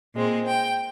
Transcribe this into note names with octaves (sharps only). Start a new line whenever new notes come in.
A#2 G#3 C4
G5